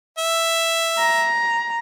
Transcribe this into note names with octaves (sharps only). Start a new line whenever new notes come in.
E5
A#5